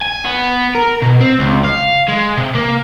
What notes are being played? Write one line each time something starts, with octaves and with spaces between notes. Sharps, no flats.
G#5
B3
A#4
B2
C4
C#2
F5
G#3
C3
A#3